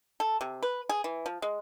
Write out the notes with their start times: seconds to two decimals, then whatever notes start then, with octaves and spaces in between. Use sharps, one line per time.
0.20 A4
0.41 C3
0.63 B4
0.89 G#4
1.04 E3
1.26 F3
1.42 G#3